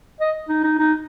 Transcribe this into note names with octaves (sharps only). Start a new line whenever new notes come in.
D#5
D#4
D#4
D#4